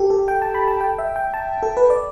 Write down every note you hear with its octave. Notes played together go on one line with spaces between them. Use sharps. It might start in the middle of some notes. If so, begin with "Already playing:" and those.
Already playing: G4 A4
A4
G5
A5
B5
A5
G5
E5
G5
A5
A4
B4
D5